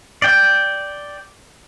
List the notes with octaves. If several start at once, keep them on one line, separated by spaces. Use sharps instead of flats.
D5 G5